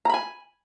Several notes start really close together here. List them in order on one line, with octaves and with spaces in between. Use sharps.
A#5 B5 G#5